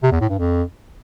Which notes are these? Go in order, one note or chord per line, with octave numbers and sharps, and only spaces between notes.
C3
E2
A2
G2
F2